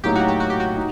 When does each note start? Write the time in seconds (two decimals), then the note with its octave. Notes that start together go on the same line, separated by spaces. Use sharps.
0.04 A2 F#3 A#3 D#4 G4
0.15 F#4
0.28 G4
0.40 F#4
0.50 G4
0.60 F#4
0.77 D#4